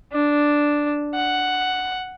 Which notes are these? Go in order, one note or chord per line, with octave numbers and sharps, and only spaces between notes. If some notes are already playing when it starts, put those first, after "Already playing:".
D4
F#5